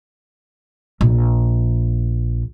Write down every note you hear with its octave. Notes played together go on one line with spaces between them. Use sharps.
A#1